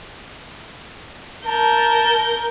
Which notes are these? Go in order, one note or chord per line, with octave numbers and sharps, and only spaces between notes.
A#4 A5 G6